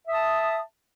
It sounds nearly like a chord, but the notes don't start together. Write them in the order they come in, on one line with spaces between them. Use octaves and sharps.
E5 D#6 A5